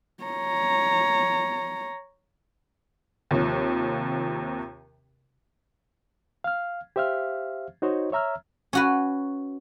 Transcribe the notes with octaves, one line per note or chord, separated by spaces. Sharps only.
C#5 A#5
D#2 C3 F3
F5 F6
G4 C5 E5 F5 F6
D#4 F#4 C5 C#5 D#5
C#5 E5 A#5 E6 F6
C#4 F#4 B4